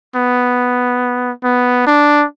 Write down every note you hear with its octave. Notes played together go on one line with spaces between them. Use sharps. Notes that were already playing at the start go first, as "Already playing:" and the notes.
B3
B3
D4